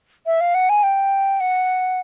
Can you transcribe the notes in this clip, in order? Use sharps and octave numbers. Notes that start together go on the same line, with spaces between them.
E5
F5
F#5
G#5
G5
F#5